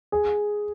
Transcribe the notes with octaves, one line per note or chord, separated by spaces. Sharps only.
G#4